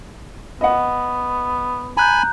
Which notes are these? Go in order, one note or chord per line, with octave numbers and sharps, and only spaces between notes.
B3 D#5 F#5
G#5 A#5 B5 F#6 G6